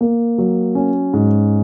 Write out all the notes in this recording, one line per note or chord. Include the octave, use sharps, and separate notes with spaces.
A#3
F#3
C#4
G#2